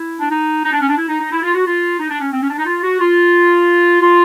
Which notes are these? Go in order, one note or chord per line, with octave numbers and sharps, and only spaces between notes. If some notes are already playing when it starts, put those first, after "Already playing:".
Already playing: E4
D4
D#4
D#4
D4
C#4
D4
E4
D#4
D#4
E4
F4
F#4
F4
D#4
D4
C#4
C4
C#4
D4
D#4
F4
F#4
F4
F4